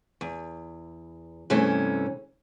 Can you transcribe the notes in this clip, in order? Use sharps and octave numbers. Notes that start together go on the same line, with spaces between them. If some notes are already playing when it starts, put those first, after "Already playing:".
E2
G2 C3 E3 A3 C#4